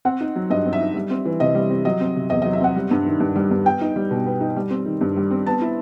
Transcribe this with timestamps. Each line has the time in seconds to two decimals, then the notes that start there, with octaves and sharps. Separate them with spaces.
0.05 C4 F#5
0.21 D#4
0.36 F#3
0.50 G2 D#5
0.65 C4
0.73 E5
0.80 D#4
0.95 G3
1.10 C4
1.25 E3
1.40 C3 D#5
1.55 G3
1.70 C4
1.85 F#3 D#5
2.01 C4
2.16 C3
2.30 E2 D#5
2.42 D#5
2.45 F#3
2.53 E5
2.61 C4 F#5
2.75 G3
2.91 G2
3.06 D#3
3.20 G2
3.36 G3
3.51 G2
3.66 B3 G5
3.81 D#4
3.96 G3
4.11 B2
4.26 B3
4.41 D#4
4.56 G3
4.70 C4
4.86 D#3
5.01 G2
5.16 G3
5.31 C4
5.46 B3 A5
5.61 E4